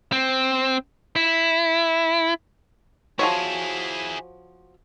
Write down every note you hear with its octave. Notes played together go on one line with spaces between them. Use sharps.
C4
E4
F3 E4 F#4 G#4 C#5